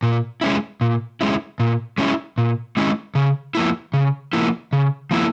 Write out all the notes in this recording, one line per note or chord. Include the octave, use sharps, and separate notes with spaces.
A#2
G#3 C#4 E4
A#2
G#3 C#4 E4
A#2
G#3 C#4 E4
A#2
G#3 C#4 E4
C#3
F3 A#3 E4
C#3
F3 A#3 E4
C#3
F3 A#3 E4